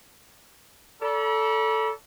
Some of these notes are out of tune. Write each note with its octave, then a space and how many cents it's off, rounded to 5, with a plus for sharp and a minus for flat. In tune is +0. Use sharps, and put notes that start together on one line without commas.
A4 +0 D5 -35 B5 -45